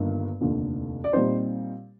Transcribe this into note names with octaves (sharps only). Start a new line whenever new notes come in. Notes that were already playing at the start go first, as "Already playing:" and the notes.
Already playing: G1 G2 D#3 A#3 D#4
F1 D#2 D3
D5
A#2 G3 C4 D#4 C5